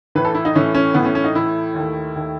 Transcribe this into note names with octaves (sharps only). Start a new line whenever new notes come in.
A2 E3 A3 B4
A4
E4
D#4
A2 E3 A3 C#4
C#4
A2 E3 A3 B3
C#4
C#4
D#4
A2 E3 A3 E4
D#2 D#3 A3
D#2 D#3 A3